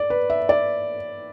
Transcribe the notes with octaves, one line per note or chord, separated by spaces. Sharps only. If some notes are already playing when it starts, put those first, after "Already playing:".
Already playing: D5
B4
E5
D5